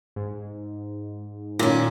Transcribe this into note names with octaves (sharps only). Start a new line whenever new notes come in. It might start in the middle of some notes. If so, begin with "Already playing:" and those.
G#2
A#2 D#3 C#4